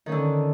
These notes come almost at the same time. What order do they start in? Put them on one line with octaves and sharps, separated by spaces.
D#3 C#4 D3